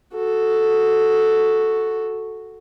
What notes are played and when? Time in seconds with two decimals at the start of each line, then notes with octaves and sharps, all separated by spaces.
0.16 F#4 A4